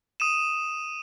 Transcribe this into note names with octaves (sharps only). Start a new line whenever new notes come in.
D#6 D#7 E7